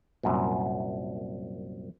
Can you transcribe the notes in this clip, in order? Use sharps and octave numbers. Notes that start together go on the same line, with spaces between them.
C2 F#2 A#2